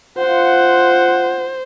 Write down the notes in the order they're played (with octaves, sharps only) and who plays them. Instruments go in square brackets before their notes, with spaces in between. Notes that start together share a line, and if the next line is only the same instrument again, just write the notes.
[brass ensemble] F4 F#5 [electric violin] C5